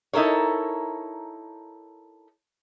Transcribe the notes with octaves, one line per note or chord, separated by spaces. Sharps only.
D#4 E4 A4 A#4 C#5